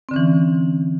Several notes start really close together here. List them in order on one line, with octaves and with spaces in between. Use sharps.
C4 D3 C#4 E3